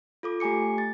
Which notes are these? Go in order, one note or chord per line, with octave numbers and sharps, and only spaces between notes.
F4 A4 D6
A3 G4 G#5 D6 C#7
A6